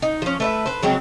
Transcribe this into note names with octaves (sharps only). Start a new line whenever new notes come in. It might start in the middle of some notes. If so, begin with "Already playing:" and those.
D#4
F3 C#4
A3 B4 E5
B4 C5
C#3 F#3 G#3 C4